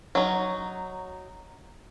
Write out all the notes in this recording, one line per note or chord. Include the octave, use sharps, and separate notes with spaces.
F#3 D#4